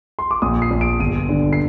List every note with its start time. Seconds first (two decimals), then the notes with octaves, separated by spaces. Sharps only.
0.19 C6
0.31 D6
0.42 A#1 D#6
0.62 C7
0.71 A#1
0.81 D7
0.99 G1 D#7
1.29 D3
1.53 C7